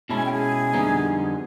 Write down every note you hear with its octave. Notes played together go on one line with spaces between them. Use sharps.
B2 G#3 C#4 E4 A5
G#5
G5
G#4 G#5
F2 D3 G3 B3 D#4